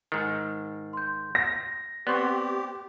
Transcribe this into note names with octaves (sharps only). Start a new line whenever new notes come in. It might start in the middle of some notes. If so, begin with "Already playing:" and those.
G#2 D#3 A6 C7
C6 G6
A#6
B3 C4 G4 D5 C6 C#6